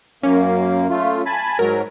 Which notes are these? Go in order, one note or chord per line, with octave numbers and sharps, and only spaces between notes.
F#2 A#3 C#4
A3 F4
G#5 A5 B5
G#2 F#3 A#4